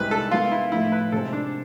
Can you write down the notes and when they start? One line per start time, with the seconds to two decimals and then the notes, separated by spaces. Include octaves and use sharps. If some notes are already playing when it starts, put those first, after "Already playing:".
Already playing: C2 C3 G#3 B4
0.11 A4
0.31 G#3 B3 E4 F4 A4
0.52 E4
0.72 A2 F3 A3 E4
0.92 B4
1.12 C3 G#3 C4 A4
1.33 D4